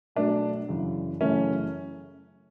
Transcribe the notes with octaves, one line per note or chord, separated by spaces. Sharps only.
B2 F#3 A3 D4
F#2 C#3 E3
F#2 C#3 E3 A3 C#4